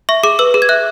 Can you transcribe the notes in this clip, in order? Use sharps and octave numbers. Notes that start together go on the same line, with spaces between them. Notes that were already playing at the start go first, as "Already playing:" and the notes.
E5 C#6
G#4 D6
B4 E6
G#4
G#6
E5 F#6